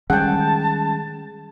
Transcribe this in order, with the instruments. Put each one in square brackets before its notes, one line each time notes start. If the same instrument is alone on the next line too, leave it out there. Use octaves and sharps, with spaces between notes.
[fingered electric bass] D#3 G3 C#4 [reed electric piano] G#3 G#4 [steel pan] F#5 G5 [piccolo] A5